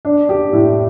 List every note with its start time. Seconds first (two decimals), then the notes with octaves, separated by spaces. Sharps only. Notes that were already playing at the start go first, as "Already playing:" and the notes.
0.05 D4
0.29 G4
0.53 A2